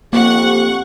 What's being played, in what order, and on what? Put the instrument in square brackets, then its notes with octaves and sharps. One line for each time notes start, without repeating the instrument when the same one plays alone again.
[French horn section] F2 C4 G4 [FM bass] A#3 [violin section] F#5 C#6